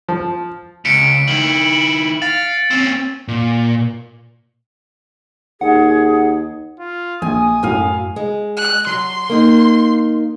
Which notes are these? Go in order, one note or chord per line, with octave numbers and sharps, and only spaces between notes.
F3
C#2 B6 C#7 D7
D#3 E4 F#7
F5 A6
C4 C#4
A#2
D#2 G#4 F#5
F4
A#1 G#5 D#6
F#2 A2 F#3 F5 G#5
G#3
F#6
F#3 C6
A#3 D#4